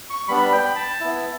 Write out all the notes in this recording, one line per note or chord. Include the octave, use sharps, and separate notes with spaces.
C#6
G3 B3 D4 B5
G5
B5
A5
B3 E4